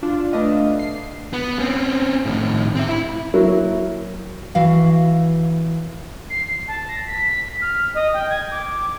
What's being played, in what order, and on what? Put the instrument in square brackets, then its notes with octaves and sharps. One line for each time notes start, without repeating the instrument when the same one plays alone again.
[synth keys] D4 F4
A3 D4 B4 D#5 F5
C7
[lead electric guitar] B3
C4 C#4
A2 D#3
C4 E5
E4 B5
[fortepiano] F#3 A#3 E4
[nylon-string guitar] E3 F#4 F5
[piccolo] C7
A5
A#6
B6
F6
D#5
G5
G#6
D6